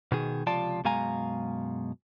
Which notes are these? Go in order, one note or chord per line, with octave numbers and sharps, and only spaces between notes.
B2 D#3 G#4
C#2 C3 F3 F4 D5 A5
F#2 B2 G#3 F5 G#5 A#5